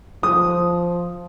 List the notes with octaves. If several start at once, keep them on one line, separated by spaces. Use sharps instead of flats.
F3 D#6